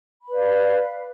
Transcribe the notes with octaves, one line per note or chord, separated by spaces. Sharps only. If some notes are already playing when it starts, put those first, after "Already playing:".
B4 D5 F5 B5